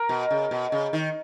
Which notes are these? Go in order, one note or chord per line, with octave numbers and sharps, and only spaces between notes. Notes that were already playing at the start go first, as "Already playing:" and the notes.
Already playing: A#4
B2
C#3
B2
C#3
D#3